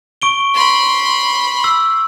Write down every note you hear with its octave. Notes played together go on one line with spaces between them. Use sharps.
C#6 D7 G7
B5 C6
E6